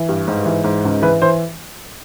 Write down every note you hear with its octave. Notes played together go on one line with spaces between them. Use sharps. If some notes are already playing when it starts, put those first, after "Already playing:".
Already playing: E3
G2
G#2
E3
G#2
C#2
E3 B4
E3 C5